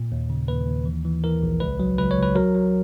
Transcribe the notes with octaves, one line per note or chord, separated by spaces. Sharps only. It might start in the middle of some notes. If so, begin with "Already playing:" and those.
Already playing: A#2
D#2
C#3
D#2 B4
D#2
E3
E3
E3 A#4
A#1
C#2 B4
F#3
C#2 B4
C#5
C#2
B4
F#3 A#4
F#3